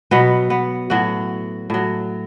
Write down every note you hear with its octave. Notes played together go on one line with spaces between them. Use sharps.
B2 F#3 B3
B3
A2 F#3 F#4
A2 F#3